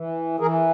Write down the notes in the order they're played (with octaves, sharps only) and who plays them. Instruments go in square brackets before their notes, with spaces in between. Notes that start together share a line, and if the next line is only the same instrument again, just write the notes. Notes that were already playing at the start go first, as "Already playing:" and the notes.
Already playing: [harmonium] E3
E3 G#4 A#4